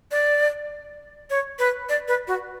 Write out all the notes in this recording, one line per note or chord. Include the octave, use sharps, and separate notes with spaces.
D5
C#5
B4
D5
B4
F#4